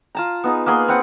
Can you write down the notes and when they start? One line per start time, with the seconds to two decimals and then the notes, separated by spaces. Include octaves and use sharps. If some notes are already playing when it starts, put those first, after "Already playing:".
0.15 F4 A5 A#5
0.44 B3 D#4 G#4
0.66 A#3 B3 G#4 C6
0.88 C4 B4 F#5